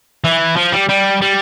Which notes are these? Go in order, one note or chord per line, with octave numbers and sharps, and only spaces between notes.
E3
F3
G3
G3
G3